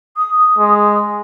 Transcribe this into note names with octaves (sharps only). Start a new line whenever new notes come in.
D#6
G#3